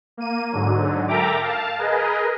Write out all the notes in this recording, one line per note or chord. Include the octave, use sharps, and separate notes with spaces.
A#3 D#7
G#2 D3 F#3
A4 A#4 E5 G5 A#5 D6
F5 A5
G#4 A#4 B4 D#5